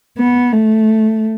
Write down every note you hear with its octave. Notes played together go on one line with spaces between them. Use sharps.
B3
A3